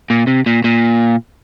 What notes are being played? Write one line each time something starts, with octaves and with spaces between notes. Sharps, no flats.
A#2
C3
A#2
A#2